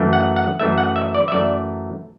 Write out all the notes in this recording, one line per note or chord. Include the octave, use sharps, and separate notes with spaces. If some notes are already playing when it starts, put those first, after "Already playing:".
Already playing: F#2 E3 A3
F#5
F#5
F#2 E3 A3 E5
F#5
E5
D5
E5
F#2 E3 A3 D5